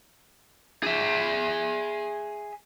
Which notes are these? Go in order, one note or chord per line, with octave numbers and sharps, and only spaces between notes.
G#4 E5